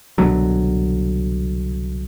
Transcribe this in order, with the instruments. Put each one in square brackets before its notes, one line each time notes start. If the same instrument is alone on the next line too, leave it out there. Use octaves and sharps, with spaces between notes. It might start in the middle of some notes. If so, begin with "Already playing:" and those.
[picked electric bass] C2 B2 D3 F#3